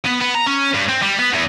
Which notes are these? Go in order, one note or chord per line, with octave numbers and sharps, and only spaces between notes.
B3
B3
A#5
C#4
G2
C4
G3
B3
E2